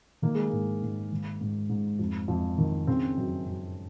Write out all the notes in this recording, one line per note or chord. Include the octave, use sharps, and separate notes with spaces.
D#3 A#3
G#3
G#2 A#3
G#2
D#3
G#2
G#2
F2
F2
D#3
C#3 C4
F#2
F#2